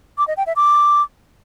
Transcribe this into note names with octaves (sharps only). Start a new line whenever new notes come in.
D6
D#5
G5
E5
D6